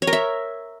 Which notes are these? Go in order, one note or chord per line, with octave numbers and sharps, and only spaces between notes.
C#5
A#4
E5